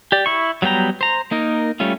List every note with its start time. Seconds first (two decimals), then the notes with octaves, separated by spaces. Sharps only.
0.12 G4 D5
0.26 E4 C#6
0.62 F#3 G3 B3 G5 A#5
1.01 C5 A#5
1.31 A#3 D#4 A#4
1.80 G3 A3 C#4 F4